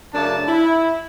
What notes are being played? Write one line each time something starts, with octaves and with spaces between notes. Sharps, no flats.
F#2 C#3 A3 D4 A5
E4